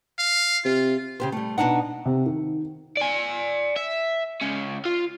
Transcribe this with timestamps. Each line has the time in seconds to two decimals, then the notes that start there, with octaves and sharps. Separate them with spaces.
0.19 F5
0.65 C3 F4
1.20 C#3 G4 C5
1.32 G3 A3
1.58 B2 A#3 D4 D#4 F#5
2.06 C3
2.26 D#3
2.97 D5 G#5
3.76 E5
4.41 C#2 C#4
4.86 F4